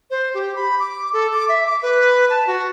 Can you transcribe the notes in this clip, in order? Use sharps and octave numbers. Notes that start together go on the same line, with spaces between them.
C5
G4
B5
D6
A4
D6
E5
D6
B4
A5
F#4